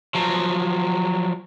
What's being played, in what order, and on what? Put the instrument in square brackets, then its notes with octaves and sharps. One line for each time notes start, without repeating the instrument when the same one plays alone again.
[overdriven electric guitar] F3 F#3